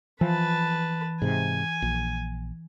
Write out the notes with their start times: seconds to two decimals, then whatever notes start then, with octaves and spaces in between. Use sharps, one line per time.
0.21 E3 F3 B4 A5
1.22 G#2 C3 G#5
1.82 A#1